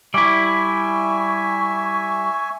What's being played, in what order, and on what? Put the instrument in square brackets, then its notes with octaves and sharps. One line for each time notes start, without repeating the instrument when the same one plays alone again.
[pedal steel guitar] G3 E4 [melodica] E5 G#5 [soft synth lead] C#6 [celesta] D6